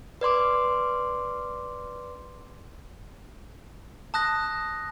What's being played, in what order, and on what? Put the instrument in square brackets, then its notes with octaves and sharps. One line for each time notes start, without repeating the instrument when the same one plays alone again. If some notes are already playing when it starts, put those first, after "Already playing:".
[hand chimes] B4 D5 C6 D6
[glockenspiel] A5 D#6 F#6 A#6